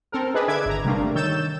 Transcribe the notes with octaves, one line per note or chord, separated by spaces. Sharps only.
C4 A4 A#4
D4 G#4 A4 B4 D#5
D3 E5 D6 G#6
G1 A#5
C3 G3 A3 A#3 D4
D#3 C#5 E6 G6 A6 E7